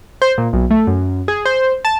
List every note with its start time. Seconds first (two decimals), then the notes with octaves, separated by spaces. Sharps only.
0.22 C5
0.38 A#2
0.53 B1
0.71 A3
0.87 F#2
1.28 G#4
1.45 C5
1.85 A5